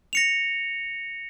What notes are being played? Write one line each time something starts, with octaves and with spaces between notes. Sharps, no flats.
A#6 C#7 F7